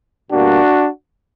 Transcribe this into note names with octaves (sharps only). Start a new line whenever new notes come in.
B2 G3 A#3 D4 F#4